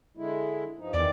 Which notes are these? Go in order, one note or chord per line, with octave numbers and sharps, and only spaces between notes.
D3 G#3 E4
G2 F3 D#4
E2 D#3 E3 D5